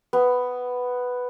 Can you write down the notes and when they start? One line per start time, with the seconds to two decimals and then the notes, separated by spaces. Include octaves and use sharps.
0.13 B3